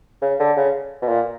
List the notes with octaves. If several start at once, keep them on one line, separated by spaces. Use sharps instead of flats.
C#3
D3
C#3
B2
A#2